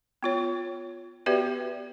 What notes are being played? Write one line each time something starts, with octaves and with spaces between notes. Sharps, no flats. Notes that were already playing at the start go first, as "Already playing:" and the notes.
B3 F4 C#5
B3 F#4 G4 B4 D5 E5